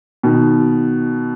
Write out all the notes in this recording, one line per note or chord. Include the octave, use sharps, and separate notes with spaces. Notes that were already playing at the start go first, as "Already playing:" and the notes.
B2 D#3